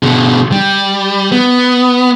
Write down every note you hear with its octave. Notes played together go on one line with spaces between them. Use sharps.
B2 D3
G3
B3